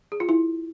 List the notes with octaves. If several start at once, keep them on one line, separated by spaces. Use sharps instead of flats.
G#4
F4
E4